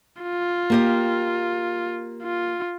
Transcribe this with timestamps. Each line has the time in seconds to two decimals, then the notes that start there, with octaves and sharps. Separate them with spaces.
0.23 F4
0.70 A#3 G4 D#5
2.23 F4